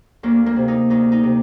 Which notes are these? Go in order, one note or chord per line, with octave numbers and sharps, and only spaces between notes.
D2 A#3
A#3
C3
D#4
D2 D#4
D#4
C3